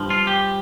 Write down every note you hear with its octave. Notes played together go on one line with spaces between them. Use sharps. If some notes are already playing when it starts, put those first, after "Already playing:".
Already playing: G2 F3
F4
G4